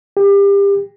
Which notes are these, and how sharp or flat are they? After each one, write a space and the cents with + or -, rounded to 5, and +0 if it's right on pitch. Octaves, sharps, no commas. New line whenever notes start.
G4 +30